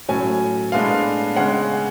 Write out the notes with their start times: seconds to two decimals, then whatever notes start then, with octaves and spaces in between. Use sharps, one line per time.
0.08 A2 F#3 C#4 G#5
0.72 A2 G#3 B3 D4 F5
1.36 C#3 G#3 C#4 F#5